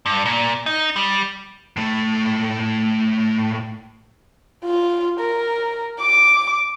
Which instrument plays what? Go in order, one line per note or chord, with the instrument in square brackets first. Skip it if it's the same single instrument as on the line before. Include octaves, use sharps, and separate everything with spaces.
[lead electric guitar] G2
A#2
D#4
G3
A2 A3
[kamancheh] F4
A#4
D6